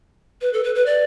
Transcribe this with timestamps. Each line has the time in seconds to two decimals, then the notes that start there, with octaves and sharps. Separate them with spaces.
0.41 B4
0.53 A4
0.64 B4
0.75 B4
0.86 D5